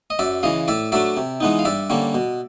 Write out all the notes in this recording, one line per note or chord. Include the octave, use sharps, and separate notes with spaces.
D#5
F#2 D5 E5
C#3 E3 D#5 F5
A2 D5 E5
F#3 A3 D4 D5 E5
C3
E3 G#3 B3 D#4
F5
G2 D5 E5
D3 G3 A#3 C#4
B2